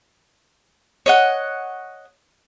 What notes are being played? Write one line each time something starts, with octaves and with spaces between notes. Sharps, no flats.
C#5 D#5 F#5